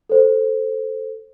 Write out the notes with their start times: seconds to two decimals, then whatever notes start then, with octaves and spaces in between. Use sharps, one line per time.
0.09 A4 C5